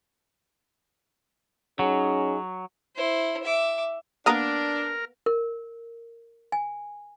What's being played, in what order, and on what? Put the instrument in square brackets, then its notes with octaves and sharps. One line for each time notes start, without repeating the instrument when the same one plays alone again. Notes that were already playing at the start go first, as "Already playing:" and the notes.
[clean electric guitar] F#3 [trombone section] C#4 D#4 G#4
[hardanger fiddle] E4 C5
E5 D6
[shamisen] A#3 B3 B4 [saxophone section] D4 [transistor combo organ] A#4 [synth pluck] A#5 D#6 F6
[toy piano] A#4
G#5